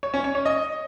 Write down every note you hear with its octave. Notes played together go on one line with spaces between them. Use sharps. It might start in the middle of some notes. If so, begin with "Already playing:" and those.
C#5
C#4
C#5
C#5
D#5